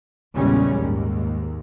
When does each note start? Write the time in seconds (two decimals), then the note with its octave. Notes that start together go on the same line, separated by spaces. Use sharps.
0.35 A#1 E2 C#3 G3 G#3 C#4
0.77 D#2 G#2